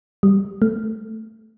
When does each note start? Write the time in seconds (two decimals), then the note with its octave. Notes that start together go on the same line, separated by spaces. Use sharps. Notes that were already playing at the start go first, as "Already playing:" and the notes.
0.23 G3
0.62 A3